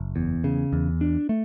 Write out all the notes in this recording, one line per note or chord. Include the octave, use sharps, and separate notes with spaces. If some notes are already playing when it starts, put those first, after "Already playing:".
Already playing: F#1
E2
C#3
E2
D4
A3